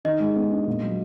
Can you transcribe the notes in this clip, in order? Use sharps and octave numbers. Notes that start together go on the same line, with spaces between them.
D#3 D#5
G#3
B3
D4
A#2
F#3